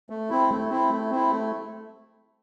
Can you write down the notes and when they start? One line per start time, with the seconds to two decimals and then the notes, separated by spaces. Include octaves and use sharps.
0.10 A3
0.30 C4 E4
0.50 A3
0.70 C4 E4
0.91 A3
1.11 C4 E4
1.31 A3